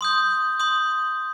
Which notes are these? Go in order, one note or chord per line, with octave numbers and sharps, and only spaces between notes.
C6 D#6 G6
C6 D#6 G6